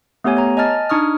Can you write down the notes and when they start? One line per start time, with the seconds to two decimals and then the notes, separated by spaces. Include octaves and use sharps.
0.24 A3 B3 G4 C#5 G#5
0.37 C#5 A#5
0.57 D#5 G#5 A5 F6 A6
0.89 D4 D#4 C#6 D#6 F6